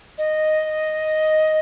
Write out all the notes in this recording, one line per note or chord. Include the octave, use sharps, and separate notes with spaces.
D#5